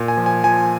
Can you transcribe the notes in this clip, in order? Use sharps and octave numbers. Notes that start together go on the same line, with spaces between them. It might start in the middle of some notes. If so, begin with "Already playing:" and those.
Already playing: A#2
G#5
F3
G#5
F3 G#5